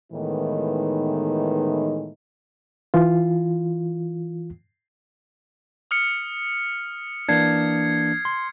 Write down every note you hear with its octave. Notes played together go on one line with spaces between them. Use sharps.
A2 D#3 E3 G#3 B3 D#4
E3 F4
D#6 F6 C#7
E3 A#3 D4 G#6 C7
C6